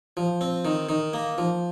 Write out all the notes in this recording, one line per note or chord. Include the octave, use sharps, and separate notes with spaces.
F3
C4
D#3
D#3
A#3
F3